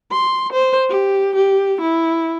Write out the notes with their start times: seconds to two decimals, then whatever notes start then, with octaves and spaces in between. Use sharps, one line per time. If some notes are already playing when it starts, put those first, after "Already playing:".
0.12 C6
0.52 C5
0.89 G4
1.35 G4
1.81 E4